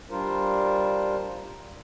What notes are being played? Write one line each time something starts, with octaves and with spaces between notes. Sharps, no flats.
G3 D4 F4 A#4 C5